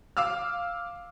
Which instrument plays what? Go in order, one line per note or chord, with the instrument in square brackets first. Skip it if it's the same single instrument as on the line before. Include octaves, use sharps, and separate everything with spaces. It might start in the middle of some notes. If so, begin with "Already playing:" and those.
[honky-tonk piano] F5 D6 E6 F6